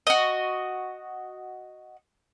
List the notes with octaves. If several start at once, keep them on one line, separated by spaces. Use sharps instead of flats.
F#4 D#5